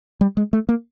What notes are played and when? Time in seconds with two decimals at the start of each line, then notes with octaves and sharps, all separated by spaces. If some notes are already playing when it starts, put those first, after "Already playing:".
0.21 G3
0.37 G#3
0.53 A3
0.69 A#3